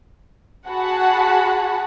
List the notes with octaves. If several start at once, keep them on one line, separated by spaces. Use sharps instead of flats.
F#4 G#4 F#5 A5 B5